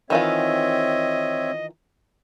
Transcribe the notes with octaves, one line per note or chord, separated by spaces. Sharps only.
D#3 E3 C4 F4 C#5 D#5 E5